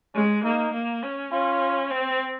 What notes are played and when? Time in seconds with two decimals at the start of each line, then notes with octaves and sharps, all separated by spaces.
0.15 G#3 C#4
0.44 A#3 D#4
0.73 A#3
1.03 C#4
1.32 C#4 F4
1.90 C4